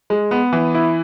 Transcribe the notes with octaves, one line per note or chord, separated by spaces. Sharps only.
G#3
B3
E3
E4